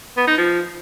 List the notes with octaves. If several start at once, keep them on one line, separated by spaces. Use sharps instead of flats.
B3
D#4
F3